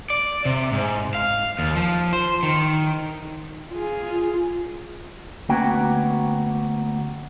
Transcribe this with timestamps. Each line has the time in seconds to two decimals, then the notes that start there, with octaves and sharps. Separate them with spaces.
0.10 D5
0.45 C3
0.72 G#2
1.15 F5
1.59 D#2
1.76 F3
2.13 C5
2.43 D#3
3.71 F4 G#4
5.49 D2 A#3 B3 C#4 F#4 G5